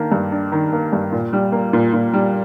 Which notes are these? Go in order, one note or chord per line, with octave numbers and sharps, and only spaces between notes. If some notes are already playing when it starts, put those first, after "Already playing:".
Already playing: D#3 A#3 D4
G2
D4
D#3
A#3
G2
A#2
G3
A#3
A#2
A#2
G3